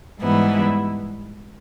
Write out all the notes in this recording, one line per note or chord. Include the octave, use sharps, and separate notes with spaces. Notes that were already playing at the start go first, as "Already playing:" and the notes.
G#2 E3 G3 B3 E4